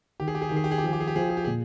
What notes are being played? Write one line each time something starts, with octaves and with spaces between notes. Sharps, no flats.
D#3 G4
G#4
G4
G#4
D#3 G4
G#4
G4
G#4
G4
F3 G#4
G4
G#4
G4
F3 G#4
G4
G#4
G4
A#2 G#4